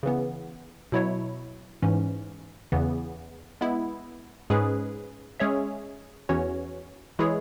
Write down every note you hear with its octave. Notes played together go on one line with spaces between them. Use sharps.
C#3 E3 B3
B2 F#3 E4 C#5
G#2 E3 C#4
E2 C#3 E3 B3
G#3 B3 E4
G#2 G#3 C#4 G#4 B4
G#3 C#4 G#4 C#5 E5
E2 E3 C#4 F#4 C#5
E3 G#3 E4 G#4 C#5